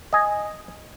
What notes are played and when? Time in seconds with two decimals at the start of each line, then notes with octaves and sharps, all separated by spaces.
0.13 D#5 G#5